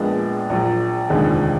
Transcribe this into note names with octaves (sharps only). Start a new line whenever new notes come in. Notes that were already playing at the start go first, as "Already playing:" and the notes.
Already playing: A#1 A#2 G#3 B3 D4
A#1 A#2 F#3
F1 D#2 D3 F3 G#3